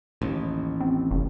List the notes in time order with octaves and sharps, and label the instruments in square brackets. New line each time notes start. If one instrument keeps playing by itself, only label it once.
[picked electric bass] A1 D#2
[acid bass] C4
F1